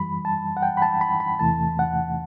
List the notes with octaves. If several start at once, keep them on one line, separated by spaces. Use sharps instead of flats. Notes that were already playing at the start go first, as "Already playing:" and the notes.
Already playing: F#2 E3 G3 B5
A5
F#5
G5
B5
A5
B5
B5
E2 C3 E3 A3 A5
F#5